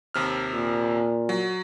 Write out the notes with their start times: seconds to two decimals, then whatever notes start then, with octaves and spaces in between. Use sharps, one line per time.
0.14 D#2 C3 F6
0.53 A#2
1.29 F#3